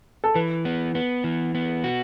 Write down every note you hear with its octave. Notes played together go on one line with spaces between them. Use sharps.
A4
E3 B4
B3
B3
E3
B3
F#4